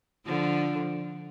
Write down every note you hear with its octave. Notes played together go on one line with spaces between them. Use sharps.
D3 F3